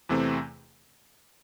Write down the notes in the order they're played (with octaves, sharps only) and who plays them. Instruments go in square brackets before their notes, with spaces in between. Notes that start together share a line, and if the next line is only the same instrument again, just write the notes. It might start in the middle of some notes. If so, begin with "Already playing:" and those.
[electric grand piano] E2 C3 E3 A3 C4